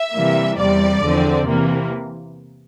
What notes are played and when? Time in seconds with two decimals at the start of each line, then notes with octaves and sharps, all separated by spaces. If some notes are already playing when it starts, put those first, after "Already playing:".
Already playing: E5
0.13 C3 E3 G3 A#3
0.57 E2 C3 G3 D5
1.02 E2 D3 F3 C4
1.46 C3 E3 A#3